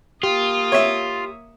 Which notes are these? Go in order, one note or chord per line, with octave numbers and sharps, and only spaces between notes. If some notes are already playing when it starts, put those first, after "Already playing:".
A#3 F4 G4 D#6
C#5 E5